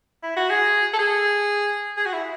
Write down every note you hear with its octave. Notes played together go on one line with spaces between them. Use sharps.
E4
F#4
G#4
A4
G#4
G#4
F#4
E4